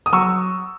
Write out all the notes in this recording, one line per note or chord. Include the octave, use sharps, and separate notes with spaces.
D#6
F#3 C#6 E6